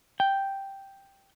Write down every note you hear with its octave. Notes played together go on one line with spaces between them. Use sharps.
G5